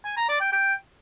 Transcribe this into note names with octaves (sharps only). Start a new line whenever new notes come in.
G#5
A#5
D5
G5
G5